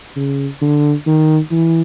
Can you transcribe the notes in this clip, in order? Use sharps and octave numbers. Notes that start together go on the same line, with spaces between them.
C#3
D3
D#3
E3